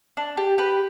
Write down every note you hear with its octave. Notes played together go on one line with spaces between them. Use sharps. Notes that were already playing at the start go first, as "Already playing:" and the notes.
D4
G4
G4 B4